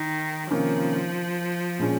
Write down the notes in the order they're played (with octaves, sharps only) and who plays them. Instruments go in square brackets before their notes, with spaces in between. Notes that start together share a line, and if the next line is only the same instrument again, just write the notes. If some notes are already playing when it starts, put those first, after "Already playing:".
Already playing: [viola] D#3
[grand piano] C3 D#3 A#3 C#4 [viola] F3
[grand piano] A#2 G#3 C#4 G#4